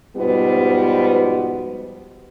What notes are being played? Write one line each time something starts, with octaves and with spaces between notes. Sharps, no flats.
G#2 B2 F3 G3 B3